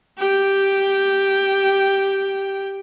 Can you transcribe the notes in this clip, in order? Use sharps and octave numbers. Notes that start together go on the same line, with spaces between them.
G4 G5